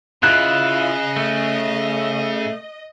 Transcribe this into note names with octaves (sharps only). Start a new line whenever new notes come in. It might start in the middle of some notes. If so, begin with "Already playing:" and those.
C#3 E4 F4 D#5 F#6
A3